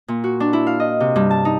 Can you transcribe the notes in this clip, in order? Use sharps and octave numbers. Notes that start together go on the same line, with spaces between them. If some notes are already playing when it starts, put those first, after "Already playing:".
A#2
F#4
D4
E4
F5
D#5
C3
G2
A5
D#4